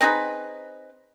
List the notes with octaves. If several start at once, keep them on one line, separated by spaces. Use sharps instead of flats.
C4 D#4 G#4 B4